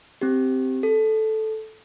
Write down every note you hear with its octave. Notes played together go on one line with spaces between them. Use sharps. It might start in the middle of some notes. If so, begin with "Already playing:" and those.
C4 G4
A4